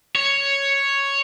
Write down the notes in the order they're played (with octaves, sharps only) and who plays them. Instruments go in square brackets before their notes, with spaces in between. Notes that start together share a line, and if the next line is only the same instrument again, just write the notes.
[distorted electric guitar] C#5